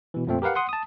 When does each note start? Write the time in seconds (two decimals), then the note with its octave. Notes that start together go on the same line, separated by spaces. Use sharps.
0.14 B2 E3
0.27 F2 A#2 F3 A3 C4
0.42 G4 A#4 B4 F5 F#5
0.55 F#5 C6 D#6
0.69 A5 D#6